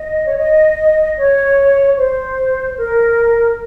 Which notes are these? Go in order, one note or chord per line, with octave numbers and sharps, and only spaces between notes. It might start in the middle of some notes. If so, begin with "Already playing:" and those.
Already playing: D#5
C#5
D#5
C#5
C5
A#4